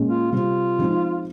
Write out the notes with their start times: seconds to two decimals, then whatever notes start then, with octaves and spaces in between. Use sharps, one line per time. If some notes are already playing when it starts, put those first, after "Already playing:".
Already playing: A#2 G#3 C#4
0.09 F4
0.32 C3 G3 C4 F4
0.79 F3 G#3 C4 D#4